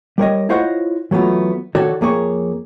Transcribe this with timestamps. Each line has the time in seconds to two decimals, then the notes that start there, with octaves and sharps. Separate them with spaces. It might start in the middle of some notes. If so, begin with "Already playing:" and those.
0.18 G3 A#4 C#5 D#5
0.49 E4 F4 C5 C#5 D#5 F#5
1.11 E3 F#3 A3 B3 F4
1.75 D#3 F#4 A4 C#5 D5
2.01 F2 A#3 G#4 C#5